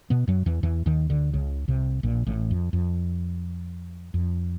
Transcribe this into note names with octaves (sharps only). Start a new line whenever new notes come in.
B2 B3
F#2 F#3
E2 E3
E2 E3
D#2 D#3
D2 D3
C#2 C#3
C2 C3
A#1 A#2
A1 A2
F2
F2
F2